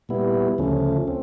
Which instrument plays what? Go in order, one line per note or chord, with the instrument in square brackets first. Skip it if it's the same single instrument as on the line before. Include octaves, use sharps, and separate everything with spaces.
[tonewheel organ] A#2 G3 B3 E4
D2 C#3 F3 A3 C#4
C4